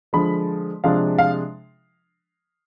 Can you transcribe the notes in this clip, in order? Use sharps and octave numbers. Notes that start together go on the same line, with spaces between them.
D3 F3 G#3 B5
C3 F3 G#3 D4 F5
F5